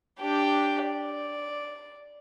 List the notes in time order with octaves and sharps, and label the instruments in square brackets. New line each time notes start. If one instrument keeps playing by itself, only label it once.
[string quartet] D4 G4 G5
D5